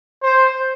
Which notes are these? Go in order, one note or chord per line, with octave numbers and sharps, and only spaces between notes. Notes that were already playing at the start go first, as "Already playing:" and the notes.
C5